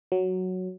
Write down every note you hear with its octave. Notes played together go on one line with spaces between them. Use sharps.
F#3